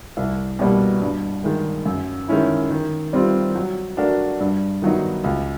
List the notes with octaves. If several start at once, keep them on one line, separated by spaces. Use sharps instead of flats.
C2
B2 G3 A#3
G2
D#3 G#3
F#2
D#3 G#3 C#4 E4
D#3
G3 C4 F4
F#3
A3 D4 F#4 A#4
G2
D#3 F#3 B3 D#4
C#2